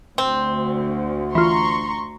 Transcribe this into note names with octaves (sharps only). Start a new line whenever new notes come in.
D2 C4
E3 F4 A#5 C6 C#6